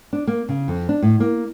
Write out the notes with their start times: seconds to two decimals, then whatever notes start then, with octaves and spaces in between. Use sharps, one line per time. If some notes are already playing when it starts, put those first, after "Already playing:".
0.13 D4
0.27 A#3
0.49 C#3
0.68 F2
0.89 D4
1.02 A2
1.20 A#3